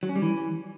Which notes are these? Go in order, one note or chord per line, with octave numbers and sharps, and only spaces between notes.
F#3
C#4
G3
E3